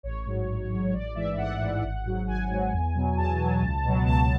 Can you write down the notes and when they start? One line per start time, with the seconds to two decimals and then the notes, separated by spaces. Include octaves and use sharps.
0.03 A1 C#5
0.25 G#2 F#3
0.48 A1
0.70 G#2 F#3
0.93 A1 D5
1.15 G#2 E3 E5
1.37 A1 F#5
1.60 G#2 E3
1.82 G#1
2.05 G#2 F#3
2.27 G#1 G#5
2.50 G#2 F#3
2.72 E2
2.95 B2 F#3
3.17 E2 A5
3.39 B2 F#3
3.62 C#2
3.84 B2 F#3
4.06 C#2 A5